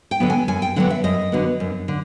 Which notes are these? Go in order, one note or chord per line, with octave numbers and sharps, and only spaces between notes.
G5
D3 F#3 B3
G#5
F#2 G#5
G5
D3 F#3 B3 F#5
E5
F#2 D#5
D3 F#3 B3
F#2
D3